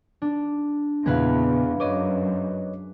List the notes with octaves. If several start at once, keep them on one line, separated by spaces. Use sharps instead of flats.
D4
E2 A#2 C#3 G#3 B3 B4 F5
F#2 B4 C#5 D#5 D6 D#7